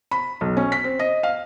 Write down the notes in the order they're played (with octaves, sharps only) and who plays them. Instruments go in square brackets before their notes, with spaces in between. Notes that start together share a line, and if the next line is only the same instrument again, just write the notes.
[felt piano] B5
B1
C#4
B6
C4
D#5
F5